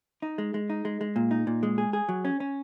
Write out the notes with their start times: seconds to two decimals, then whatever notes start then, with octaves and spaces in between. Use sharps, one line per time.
0.22 D#4
0.38 G#3
0.54 G#3
0.70 D#4
0.85 G#3
1.01 G#3
1.16 A#2
1.31 D#4
1.47 A#2
1.63 G#3
1.78 G#4
1.93 G#4
2.09 F#3
2.25 C#4
2.40 C#4